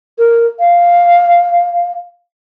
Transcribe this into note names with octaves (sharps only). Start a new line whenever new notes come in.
A#4
F5